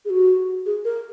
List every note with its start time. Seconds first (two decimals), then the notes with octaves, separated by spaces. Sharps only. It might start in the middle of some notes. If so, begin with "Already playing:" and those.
0.05 G#4
0.10 F#4
0.66 G#4
0.85 A#4